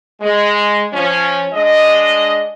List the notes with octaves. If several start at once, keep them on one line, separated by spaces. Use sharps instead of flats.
G#3
F3 C#4
G#3 D4 D#5